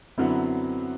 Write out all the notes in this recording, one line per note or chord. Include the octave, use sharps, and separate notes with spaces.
F#2 D3 F#3 B3 C4 E4